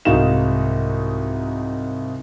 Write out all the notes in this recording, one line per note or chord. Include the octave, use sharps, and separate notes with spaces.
C2 G#2 D#4 F#4 F5 E7